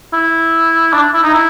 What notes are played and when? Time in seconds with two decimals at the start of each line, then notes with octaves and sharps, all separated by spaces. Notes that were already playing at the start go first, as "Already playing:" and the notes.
0.13 E4
0.93 D4
1.14 E4
1.24 D#4
1.34 E4